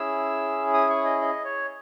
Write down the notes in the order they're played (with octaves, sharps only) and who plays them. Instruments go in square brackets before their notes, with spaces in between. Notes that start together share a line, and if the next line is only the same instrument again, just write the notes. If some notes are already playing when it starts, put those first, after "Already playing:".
Already playing: [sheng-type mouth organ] C#4 E4 G#4 E6
D#6
C#6
D#5
D#5
C#5